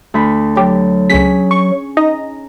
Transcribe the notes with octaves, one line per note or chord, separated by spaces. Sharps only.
D2 B5
F#3 G4
C#2 C#4 G#4 B6
C#6
D#4 D#5 A#5